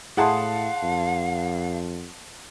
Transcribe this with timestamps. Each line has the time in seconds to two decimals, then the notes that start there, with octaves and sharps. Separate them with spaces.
0.17 A2 E4 G#4 F5 F#5 A5 C6
0.82 F2